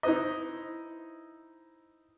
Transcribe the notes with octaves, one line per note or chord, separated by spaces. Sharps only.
D#4 E4 B4 C5 D#5